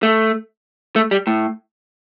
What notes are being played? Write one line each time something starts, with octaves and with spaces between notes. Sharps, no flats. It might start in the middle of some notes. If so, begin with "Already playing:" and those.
A3
A3
G3
A2